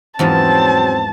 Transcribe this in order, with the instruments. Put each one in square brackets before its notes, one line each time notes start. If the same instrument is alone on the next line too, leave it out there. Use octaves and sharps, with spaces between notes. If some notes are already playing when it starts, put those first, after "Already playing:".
[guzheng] E2 G#2 F3 [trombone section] F#3 C4 C#4 [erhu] A5